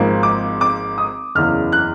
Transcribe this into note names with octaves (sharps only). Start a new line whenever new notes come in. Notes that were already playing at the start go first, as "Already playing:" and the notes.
Already playing: G#1 G#2 F3 A#3
D6
D6
D#6
F#1 E2 C#3 E3 F6
F#6